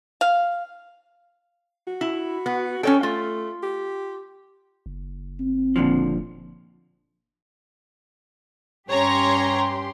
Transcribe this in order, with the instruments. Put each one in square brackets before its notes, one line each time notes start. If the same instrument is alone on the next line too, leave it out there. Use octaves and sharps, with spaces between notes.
[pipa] F5
[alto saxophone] F#4
[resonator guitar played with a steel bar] E4
B3
[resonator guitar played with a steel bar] C#4 C#5 G5 [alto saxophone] A4
[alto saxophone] A3 [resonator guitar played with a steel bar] F4
[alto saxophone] G4
[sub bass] F#1
[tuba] C4
[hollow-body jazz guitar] A#2 D3 F3
[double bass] G2 C#4 [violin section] G4 C6 [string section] C#5 A#5